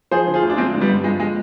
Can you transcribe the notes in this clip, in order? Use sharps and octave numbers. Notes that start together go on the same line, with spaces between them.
F3 G#4 C5
D3
F4 G#4
D2
D4
F3 G#3 C4
D3
G3 B3
G2
F3 G#3
D3 G#3